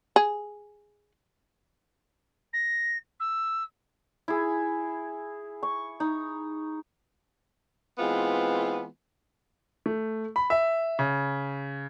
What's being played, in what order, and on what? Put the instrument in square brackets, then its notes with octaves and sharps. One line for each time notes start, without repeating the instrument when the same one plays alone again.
[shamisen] G#4
[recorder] A#6
E6
[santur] E4 G#4
C#6
D#4
[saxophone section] E3 G#3 B3 C4 F4
[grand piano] A3
B5
E5
C#3